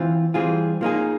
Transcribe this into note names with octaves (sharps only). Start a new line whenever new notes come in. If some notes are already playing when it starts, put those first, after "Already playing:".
Already playing: E3 C4 F4
E3 G3 C4 F4 G#4
F3 A#3 D#4 G#4